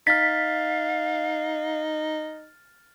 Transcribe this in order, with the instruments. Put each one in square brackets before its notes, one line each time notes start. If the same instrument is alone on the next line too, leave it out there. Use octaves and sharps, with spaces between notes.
[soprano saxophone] D#4 [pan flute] F5 [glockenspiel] F6 A6 [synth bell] B6